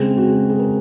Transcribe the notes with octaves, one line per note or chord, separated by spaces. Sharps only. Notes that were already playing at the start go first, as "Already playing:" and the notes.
Already playing: C#3 G#3 C4 G#4
F#4
G#4
A#4